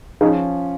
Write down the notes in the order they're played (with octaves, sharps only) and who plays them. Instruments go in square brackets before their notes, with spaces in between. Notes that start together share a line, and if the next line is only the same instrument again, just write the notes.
[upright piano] F3 C#4 [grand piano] D#4 G#4